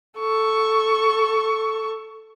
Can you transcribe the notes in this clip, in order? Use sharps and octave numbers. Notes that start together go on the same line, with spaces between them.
A4 C#6